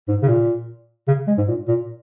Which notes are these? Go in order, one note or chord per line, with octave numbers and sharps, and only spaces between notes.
G#2
C#3
A#2
C#3
G#3
G#2
A#2
A#2